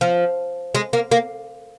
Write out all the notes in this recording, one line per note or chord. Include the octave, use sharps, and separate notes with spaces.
F3
G#3
A#3
A#3